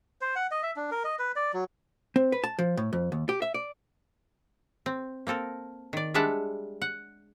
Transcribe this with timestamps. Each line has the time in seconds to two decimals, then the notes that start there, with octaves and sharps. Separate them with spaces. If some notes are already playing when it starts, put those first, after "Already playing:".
0.21 C5
0.35 F#5
0.51 D#5
0.63 E5
0.76 D4
0.91 A#4
1.04 D#5
1.19 B4
1.36 D5
1.53 F#3
2.16 C4
2.32 B4
2.44 A5
2.59 F3
2.77 A2
2.93 F2
3.12 D#2
3.29 G4
3.42 E5
3.54 D5
4.86 C4
5.27 A#3 C4 A4 A#4
5.93 D#3 D5
6.14 G3 G#3 D4 E5 F#5 A5
6.82 F#5